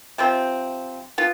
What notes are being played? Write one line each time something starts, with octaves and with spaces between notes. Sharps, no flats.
C3 F3 C4
B3 F4